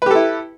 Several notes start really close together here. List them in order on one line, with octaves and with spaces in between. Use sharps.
B4 G4 A4 E4